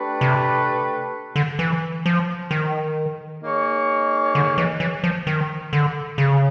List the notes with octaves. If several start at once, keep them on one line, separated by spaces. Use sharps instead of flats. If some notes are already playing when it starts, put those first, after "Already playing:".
Already playing: A3 D4 G4 B4
C3
D3
E3
F3
D#3
A#3 D#4 G#4 C#5
D3
E3
E3
F3
D#3
D3
C#3